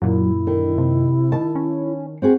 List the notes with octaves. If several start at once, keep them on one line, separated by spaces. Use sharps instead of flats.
F#2 A#2 F#3 E4
D3 D#3
C3
D#3 A5
C#4
C4 F#4 G#4